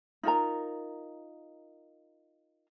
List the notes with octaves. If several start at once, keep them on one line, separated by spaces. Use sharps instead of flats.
D#4 F4 A#4 A#5